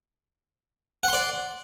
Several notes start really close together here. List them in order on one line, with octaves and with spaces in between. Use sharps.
F#5 C6 D5